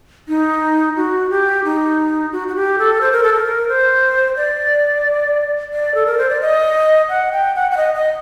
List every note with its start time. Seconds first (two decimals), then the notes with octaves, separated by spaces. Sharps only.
0.28 D#4
0.96 F#4
1.30 G4
1.65 D#4
2.32 F#4
2.48 F#4
2.56 G4
2.79 A4
3.01 C5
3.12 A#4
3.23 A4
3.33 A#4
3.68 C5
4.36 D5
5.73 D5
5.95 A4
6.06 A#4
6.18 C5
6.29 D5
6.41 D#5
7.09 F#5
7.32 G5
7.55 F#5
7.71 F#5
7.77 D#5
7.95 D#5